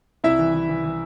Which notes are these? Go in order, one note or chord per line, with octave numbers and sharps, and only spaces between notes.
C2 E4 E5
E3
E3
E3
E3